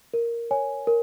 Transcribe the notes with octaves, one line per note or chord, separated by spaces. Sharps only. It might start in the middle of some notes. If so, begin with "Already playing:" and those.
A#4
C#5 G#5
A#4